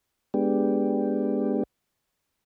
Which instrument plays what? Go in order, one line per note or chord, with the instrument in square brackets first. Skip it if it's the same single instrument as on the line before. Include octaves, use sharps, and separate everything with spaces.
[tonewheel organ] G#3 B3 D4 G4